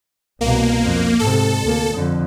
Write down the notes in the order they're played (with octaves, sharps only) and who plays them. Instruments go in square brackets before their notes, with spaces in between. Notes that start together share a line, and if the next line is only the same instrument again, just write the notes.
[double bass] C2 B2 [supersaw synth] A#3
[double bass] F2
[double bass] G#2 C3 [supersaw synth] A4
[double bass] D2 A#3
F2 D3